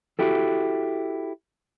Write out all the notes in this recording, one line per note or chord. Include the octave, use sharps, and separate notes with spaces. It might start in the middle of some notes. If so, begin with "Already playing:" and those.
E4 F#4 G4 A4